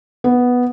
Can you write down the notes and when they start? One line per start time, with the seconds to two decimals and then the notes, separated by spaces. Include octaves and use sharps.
0.24 B3